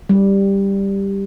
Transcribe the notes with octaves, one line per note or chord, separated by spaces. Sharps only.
G3